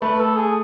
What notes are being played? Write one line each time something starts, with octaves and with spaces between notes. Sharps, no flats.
A3 B4
A4
G#4